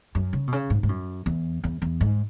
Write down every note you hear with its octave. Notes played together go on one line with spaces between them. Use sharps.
F#2
C#3
B2
C#3
G#2
G#2
F#2
E2
E2
E2
G#2